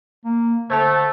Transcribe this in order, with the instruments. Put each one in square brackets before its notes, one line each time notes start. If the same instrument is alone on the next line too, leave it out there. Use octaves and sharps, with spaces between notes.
[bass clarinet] A#3
[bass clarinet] D3 [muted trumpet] A3 [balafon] C5 A5